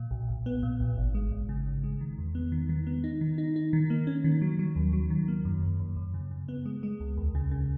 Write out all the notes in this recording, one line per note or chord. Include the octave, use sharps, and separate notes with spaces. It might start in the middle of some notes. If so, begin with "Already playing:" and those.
Already playing: A#2
B1
B1
B3
A#2
B1
G#1
G#3
G#1
C#3
G#1
G#3
D#3
E2
B3
D#3
D#3
B3
D#4
D#3
D#4
D#4
D#3
A#3
C#4
D#3
F#3
F#3
D#2
F#3
D#3
A#3
F#2
F#2
F#2
F#2
C#3
C#3
B3
G#3
G#3
C#2
D#2
C#3
C#3